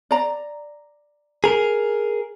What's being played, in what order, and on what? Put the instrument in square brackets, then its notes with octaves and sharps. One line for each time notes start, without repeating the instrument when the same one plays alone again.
[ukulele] D5 A#5
[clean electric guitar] G#4 A#4